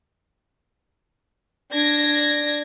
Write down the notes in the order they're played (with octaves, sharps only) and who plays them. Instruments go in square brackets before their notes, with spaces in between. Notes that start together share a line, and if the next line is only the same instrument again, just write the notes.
[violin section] D4 G#6 A#6